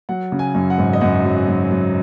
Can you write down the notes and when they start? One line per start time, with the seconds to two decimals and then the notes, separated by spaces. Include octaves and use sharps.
0.09 F#3 F#5
0.32 C#3
0.39 G#5
0.55 F#2
0.70 F#5
0.78 G#1
0.93 D#5
1.01 F#2 F#5
1.25 F#3
1.48 F#3
1.71 F#3